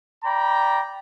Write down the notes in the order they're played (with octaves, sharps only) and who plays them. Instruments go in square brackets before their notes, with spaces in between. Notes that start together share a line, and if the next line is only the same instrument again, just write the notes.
[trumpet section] D5 G5 A#5 B5